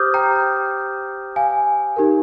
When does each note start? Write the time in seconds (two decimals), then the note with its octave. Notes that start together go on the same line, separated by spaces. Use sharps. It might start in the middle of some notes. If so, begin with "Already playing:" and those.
Already playing: G4 C5 D6 D#6 F6 G6
0.14 G5 A#5
1.36 F5 G#5
1.96 D#4 G4 A#4